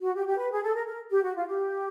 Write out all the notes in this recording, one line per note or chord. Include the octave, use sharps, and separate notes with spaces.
F#4
G4
G4
B4
G#4
A4
A#4
A#4
G4
F#4
F4
G4